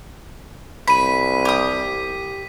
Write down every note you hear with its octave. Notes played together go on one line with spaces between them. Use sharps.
C2 B5 B6 D#7
G4 D#6